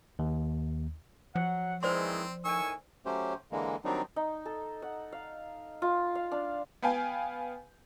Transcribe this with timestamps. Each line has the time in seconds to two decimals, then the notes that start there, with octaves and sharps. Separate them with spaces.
0.19 D#2
1.35 F3 F#3 F#5
1.83 D#3 E3 G#3 C4 C5 D5 C6
2.45 A2 D#3 G#5 C#6 E6
3.06 F#3 A3 C#4 G4 C5
3.52 D3 E3 G#3 A#3
3.85 D#3 F#3 G3 C4 D4 D#4
4.16 D#4
4.46 A4
4.82 F#5
5.12 F5
5.82 F4
6.15 F5
6.31 D4
6.82 B3 B4 F5 G5 G#5